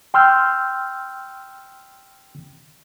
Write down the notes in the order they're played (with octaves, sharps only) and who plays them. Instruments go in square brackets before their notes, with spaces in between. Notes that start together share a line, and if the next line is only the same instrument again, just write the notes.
[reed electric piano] G5 C6 E6 F6 G6